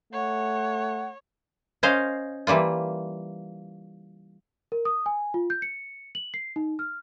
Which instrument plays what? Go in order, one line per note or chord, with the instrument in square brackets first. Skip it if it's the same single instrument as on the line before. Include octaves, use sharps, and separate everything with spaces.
[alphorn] A3 [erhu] C#5 [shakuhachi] F#5
[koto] C#4 C5 D#5 F5
E3 G3 A#3 F4
[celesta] A#4
D#6
G#5
F4
G6
C#7
F#7
C7
D#4
F6